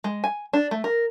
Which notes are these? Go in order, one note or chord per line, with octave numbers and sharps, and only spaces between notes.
G#3
G#5
D4
A3
A#4